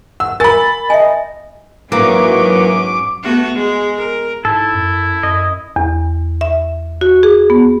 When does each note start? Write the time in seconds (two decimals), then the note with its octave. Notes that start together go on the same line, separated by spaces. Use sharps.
0.20 F#5 E6
0.40 A#4 G#5 B5 A6
0.90 D#5 E5 G#5
1.92 G#2 E3 F#3 A#3 C#4 D6
3.23 A3 B3 F#4
3.54 G#3
3.97 A#4
4.45 G#2 E4 A4
4.74 F#2
5.23 F#2 D#5
5.76 E2
6.41 E5
7.01 F#4
7.23 G#4
7.50 B3